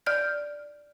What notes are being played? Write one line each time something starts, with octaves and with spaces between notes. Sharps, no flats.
D5 F6 G6